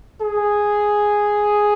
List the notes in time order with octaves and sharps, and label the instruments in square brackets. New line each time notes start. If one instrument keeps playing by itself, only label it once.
[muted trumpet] G#4